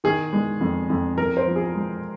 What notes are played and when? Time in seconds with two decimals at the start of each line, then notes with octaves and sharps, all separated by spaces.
0.04 D#3 G#4
0.33 G#3
0.61 F2
0.90 F2
1.18 F2 A#4
1.37 C5
1.46 F3
1.56 G#4
1.75 G#3